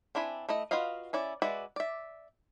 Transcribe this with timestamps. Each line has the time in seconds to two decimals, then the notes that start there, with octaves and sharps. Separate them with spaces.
0.15 C4 D4 E4 G#5 B5
0.49 A3 E4 D#5
0.71 F4 F#4 B4 D#5 F5
1.13 C#4 E4 D5
1.42 G#3 F#4 B4 D5 E5
1.76 D5 E5